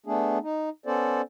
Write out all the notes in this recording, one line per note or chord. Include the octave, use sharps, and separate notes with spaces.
A3 B3 D4 G#4
D#4
B3 C#4 A4 C5 D5